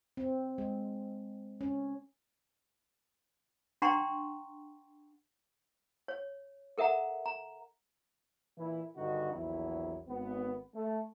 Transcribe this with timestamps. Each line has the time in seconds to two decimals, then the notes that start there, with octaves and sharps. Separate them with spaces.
0.17 C4
0.58 G#3
1.61 C#4
3.82 D4 F#5 G5 A#5 C6 C#6
6.08 C#5
6.78 A4 A#4 E5 F#5 A#5
7.26 A#5
8.58 A#2 E3 E4
8.96 G2 D3 D#3 D#4 F#4
9.33 A#1 E2 F#3 E4
10.08 G#1 B3
10.75 A3